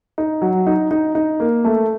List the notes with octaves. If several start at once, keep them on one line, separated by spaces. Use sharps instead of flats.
D#4
F#3
D#4
D#4
D#4
A#3
A3